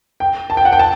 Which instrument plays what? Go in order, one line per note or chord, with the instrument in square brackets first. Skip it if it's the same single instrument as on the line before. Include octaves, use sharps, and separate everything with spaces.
[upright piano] G5
A5
G5
F#5
G5
A5